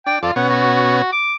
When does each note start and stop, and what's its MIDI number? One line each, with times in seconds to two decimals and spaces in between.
0.06 0.19 62
0.06 0.17 79
0.23 0.31 41
0.23 0.33 65
0.23 0.31 69
0.23 0.31 74
0.36 1.02 47
0.36 1.02 61
0.36 0.47 78
0.49 1.12 66
1.12 1.35 86